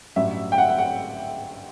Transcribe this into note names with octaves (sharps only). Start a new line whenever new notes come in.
A1 G2 F#3 E5
G5
F#5
F#5
F#5